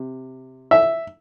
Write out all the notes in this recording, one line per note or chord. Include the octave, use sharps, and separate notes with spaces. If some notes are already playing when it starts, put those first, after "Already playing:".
Already playing: C3
E5